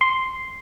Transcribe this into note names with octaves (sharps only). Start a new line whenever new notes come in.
C6